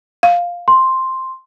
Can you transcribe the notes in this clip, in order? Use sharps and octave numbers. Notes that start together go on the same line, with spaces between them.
F5
C6